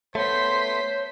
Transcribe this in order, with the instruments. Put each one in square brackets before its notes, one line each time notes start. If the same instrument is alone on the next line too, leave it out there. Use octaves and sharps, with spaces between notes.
[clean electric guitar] A3 B3 [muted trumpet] C5 [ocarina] C#5 [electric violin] C6 B6